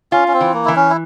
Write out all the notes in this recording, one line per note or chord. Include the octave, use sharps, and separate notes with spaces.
C#4 F4
C#4
C4
E3
A#3
E3 E4
C#4
E4